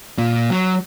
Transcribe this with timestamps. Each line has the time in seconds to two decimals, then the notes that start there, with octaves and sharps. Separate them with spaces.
0.18 A#2
0.51 F#3